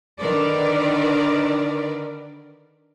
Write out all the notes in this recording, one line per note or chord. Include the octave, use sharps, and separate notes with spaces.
D3 D#3 A#4 B4 D5